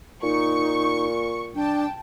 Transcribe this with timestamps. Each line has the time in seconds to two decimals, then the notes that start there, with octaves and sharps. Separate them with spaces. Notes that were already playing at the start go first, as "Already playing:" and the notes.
0.23 A#2 D#4 C#6
1.55 C2 D4 G5 A5